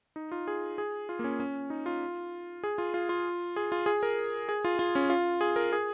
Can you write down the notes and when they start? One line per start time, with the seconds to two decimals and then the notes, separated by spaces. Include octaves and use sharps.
0.16 D#4
0.32 F4
0.47 G#4
0.78 G#4
1.09 F4
1.19 A#3
1.24 C#4
1.40 C#4
1.70 D#4
1.86 F4
2.64 G#4
2.78 F4
2.94 F4
3.09 F4
3.56 G#4
3.72 F4
3.86 G#4
4.03 A#4
4.49 G#4
4.65 F4
4.79 F4
4.95 C#4
5.10 F4
5.41 G#4
5.56 A#4
5.73 G#4